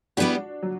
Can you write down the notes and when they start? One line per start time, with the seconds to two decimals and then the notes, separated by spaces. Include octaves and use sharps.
0.17 G3 B3 D4 E4 F#4 G4
0.63 F#3